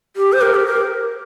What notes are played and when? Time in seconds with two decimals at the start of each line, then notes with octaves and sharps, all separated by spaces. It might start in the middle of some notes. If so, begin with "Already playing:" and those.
0.16 G4
0.33 C5
0.42 A#4
0.55 G4
0.66 A#4